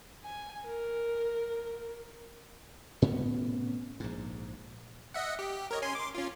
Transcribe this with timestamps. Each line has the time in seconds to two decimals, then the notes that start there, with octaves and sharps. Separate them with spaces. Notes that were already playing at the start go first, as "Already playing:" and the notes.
0.22 G#5
0.66 A#4
3.02 A2 C3 B3 C#4
4.00 A#1 G#2
5.14 D#5 E5 F#5
5.39 G4
5.71 A#4 C#5 D#5
5.82 C#4 G#5 C6
5.95 C6 D6
6.15 C#4 F4